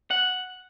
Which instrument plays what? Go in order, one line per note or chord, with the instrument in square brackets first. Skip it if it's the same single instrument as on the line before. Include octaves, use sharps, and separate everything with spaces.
[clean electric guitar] F#5